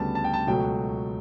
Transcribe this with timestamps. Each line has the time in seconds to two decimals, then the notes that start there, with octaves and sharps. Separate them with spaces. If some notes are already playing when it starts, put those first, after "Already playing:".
Already playing: D2 C#3 G3 B3 A5
0.15 A5
0.24 G5
0.34 A5
0.47 C#2 B2 F#3 A3 G5